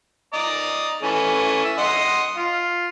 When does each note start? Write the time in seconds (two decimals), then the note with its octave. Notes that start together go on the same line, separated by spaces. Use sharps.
0.33 D5 D#5 A#5
1.02 E3 A3 C#4
1.65 E5
1.78 D#5 F#5 C6
2.36 F4